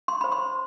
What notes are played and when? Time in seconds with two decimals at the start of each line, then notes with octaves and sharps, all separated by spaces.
0.08 C6
0.21 C5 B5
0.32 C6